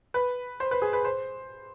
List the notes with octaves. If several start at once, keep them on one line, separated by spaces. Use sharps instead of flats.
B4
C5
B4
G#4
B4
C5